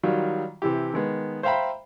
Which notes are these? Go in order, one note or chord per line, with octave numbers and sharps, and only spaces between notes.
D#3 F#3 G3 F4
C3 E3 E4 G4
D#3 G#3 B3
C5 E5 F5 G5 A#5 B5